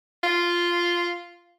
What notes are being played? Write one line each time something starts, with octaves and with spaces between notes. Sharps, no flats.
F4